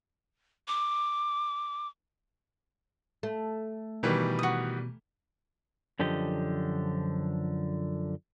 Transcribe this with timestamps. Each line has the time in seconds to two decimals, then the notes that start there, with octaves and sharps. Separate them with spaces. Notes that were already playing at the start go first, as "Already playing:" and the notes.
0.68 D6
3.23 A3
4.03 B2 D#3 E3 G3
4.39 F#4 D#6
5.99 F#2 D3 F3 G4 D#5